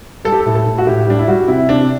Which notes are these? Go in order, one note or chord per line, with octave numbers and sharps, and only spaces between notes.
G3 A4
G4
A4
A2
A4
A2
F#4
A2 G4
G3 D4
E4
G3 F#4
C3 E4
C3 D4